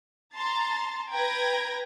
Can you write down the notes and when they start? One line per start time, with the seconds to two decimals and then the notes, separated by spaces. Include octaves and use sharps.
0.35 A5 A#5 C6 A6
1.10 B4 G5 A#5 G#6 A#6